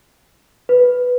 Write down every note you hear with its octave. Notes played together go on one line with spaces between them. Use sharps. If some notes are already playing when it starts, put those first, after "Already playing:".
B4